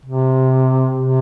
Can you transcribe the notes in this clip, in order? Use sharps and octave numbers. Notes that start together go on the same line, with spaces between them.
C3
C3